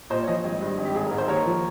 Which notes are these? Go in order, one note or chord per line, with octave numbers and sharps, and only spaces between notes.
A#2 C5 D#5
C#5
F3 C5 D#5
G#1
G2
G#1
G4
G#1 G#4
G#2 A#4
C5
D#2 A#4 C#5
F3